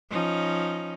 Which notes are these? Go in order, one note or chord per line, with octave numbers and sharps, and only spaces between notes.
F3 C#4 D#4